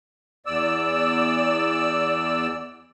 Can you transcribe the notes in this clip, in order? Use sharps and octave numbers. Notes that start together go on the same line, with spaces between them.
E2 D5 E6